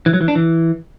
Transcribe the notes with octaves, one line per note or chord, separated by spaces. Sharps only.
E3
F#3
E3
D4
E3